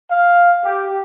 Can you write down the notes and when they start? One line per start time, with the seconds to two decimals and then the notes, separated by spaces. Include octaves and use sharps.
0.11 F5
0.63 G4